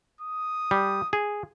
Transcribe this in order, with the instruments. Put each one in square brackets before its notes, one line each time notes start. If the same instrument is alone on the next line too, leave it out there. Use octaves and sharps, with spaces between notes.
[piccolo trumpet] D#6
[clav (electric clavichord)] G3
G#4